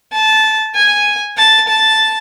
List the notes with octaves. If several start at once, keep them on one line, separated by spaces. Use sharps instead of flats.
A5
G#5
A5
A5